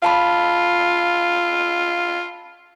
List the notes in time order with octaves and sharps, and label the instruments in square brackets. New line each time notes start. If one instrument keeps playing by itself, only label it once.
[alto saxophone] F4 [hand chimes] F5 A5 B5